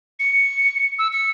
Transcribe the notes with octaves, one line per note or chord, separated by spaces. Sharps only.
C#7
E6
C#7